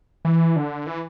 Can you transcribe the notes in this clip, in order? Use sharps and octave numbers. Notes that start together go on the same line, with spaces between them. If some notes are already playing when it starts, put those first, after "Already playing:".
E3
D3
E3